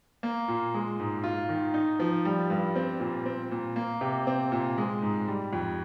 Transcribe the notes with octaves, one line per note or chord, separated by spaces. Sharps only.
A#3
A#2
G#3
G#2
F4
D#3
D#4
F3
G3
G2
C4
A#2
C4
A#2
A#3
C3
C4
A#2
G#3
G#2
G3
F2